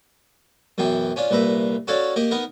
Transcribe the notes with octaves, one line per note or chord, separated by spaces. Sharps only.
F#2 B2 E3 G5
C#4 D4 F4
C2 A#2 B4 E5 A#5
C#4 F#4 A4 C#5 D5 F5
A#3 G4 D#5
B3 D#4 A#4